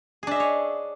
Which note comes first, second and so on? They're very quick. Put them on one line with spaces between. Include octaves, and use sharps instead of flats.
G#4 D4 E5 D#5 C#5